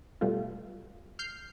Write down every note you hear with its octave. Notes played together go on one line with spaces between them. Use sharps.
B2 G3 A3 F4
F6 G6 C7